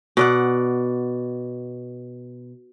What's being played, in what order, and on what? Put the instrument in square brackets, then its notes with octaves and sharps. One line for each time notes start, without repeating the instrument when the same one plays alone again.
[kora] B2 D5 F#5